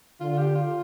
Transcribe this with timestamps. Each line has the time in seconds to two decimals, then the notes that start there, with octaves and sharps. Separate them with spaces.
0.20 D3 F4
0.34 F4
0.38 G4
0.55 F4